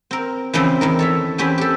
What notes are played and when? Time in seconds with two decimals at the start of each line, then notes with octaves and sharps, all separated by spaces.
0.11 C4 A#4
0.53 C#3 E3 F3 C4
0.81 E2 D#3 A#4
0.99 A4 C#5 E5
1.38 E2 C4 C#4 G4 B4
1.58 G4 A4